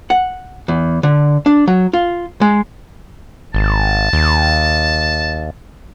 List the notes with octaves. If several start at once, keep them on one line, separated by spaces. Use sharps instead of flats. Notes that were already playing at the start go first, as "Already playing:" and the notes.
F#5
E2
D3
D4
F#3
F4
G#3
G#1 A5
D#2